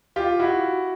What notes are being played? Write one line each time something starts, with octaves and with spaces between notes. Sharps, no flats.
F4 G4
E4 F#4